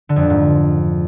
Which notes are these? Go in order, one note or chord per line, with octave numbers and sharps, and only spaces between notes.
D3
F2
A#2
G#2